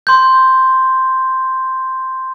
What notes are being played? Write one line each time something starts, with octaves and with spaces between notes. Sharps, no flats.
C6 G6